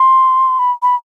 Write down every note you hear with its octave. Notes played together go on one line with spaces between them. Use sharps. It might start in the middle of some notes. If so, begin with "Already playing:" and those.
Already playing: C6
B5
B5